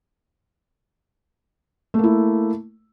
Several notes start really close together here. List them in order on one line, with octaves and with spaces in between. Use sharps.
A3 A#3 E4